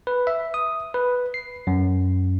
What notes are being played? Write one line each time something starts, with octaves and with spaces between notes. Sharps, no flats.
B4
E5
D#6
B4
C7
F#2